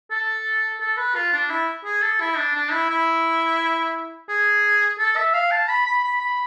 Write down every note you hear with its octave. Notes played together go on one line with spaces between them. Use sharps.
A4
A4
B4
F4
D4
E4
G#4
A4
E4
D4
D4
E4
E4
G#4
A4
E5
F5
A5
B5
B5
B5
B5